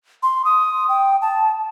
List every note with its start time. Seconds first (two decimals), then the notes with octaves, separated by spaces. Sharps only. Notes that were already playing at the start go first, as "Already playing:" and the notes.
0.23 C6
0.45 D#6
0.89 G5
1.22 A5